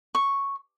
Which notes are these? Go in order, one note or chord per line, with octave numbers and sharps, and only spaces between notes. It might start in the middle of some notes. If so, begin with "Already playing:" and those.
C#6